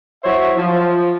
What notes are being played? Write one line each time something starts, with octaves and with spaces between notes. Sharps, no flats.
F#3 E4 C5 C#5 E5
F3